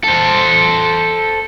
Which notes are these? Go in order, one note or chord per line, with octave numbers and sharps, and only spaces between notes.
A4 C5